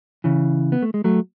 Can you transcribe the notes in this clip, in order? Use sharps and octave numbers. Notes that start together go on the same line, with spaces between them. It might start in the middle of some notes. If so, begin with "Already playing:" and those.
C#3 E3
B3
A3
G#3
F#3 A3